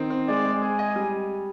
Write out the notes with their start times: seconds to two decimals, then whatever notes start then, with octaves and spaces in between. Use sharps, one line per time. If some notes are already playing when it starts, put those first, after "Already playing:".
Already playing: D#3 C4
0.10 C4
0.28 G#3 D5
0.45 G#3
0.62 G#4 G#5
0.79 D#5
0.96 G3